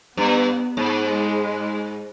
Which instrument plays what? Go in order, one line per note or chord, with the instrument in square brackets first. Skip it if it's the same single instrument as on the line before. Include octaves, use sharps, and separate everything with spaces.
[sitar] G2 [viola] B3
[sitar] G#2
[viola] G#3